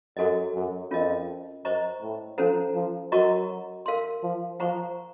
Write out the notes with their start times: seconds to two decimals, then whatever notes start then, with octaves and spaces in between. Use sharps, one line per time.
0.17 F#2 F#4 A4 D#5
0.54 F#2
0.91 F2 C#4 F4 A#4 D#5
1.64 F#2 C5 D#5 A#5 C#6
2.02 A2
2.38 F3 C#4 A4 C5 F#5 A#5
2.75 F3
3.12 F#3 F#4 A#4 D#5 A#5 C#6
3.86 A#4 F5 C6
4.23 F3
4.60 F3 C5 F#5 A#5 C#6